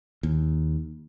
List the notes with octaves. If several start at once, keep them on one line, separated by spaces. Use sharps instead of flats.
D#2